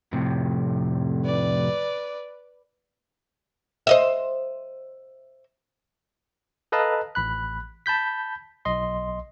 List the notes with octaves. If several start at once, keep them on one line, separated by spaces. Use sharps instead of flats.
F2 A2 C3
B4 D5
C5 D#5 E5
A4 B4 D#5 F5 A5 A#5
A1 B5 F#6
A5 B5 G6 B6
B1 D#5 C6